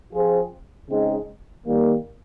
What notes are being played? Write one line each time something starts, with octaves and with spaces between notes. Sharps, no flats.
F3 C4 F4 G#4 C5
C#3 G#3 C4 D#4
D#3 G3 A#3